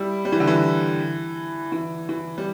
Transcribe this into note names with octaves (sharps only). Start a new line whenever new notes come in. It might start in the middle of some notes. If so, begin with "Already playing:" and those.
Already playing: G3 E4
G3
E3
D3
E3
E3
E3
G3